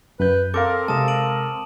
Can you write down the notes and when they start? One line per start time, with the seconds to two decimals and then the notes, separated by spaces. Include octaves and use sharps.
0.20 F#2 B4 G6
0.54 C4 A4 A#4 F5 D6
0.88 C3 G#3 A5 D#6 E7
1.08 D7 D#7 F#7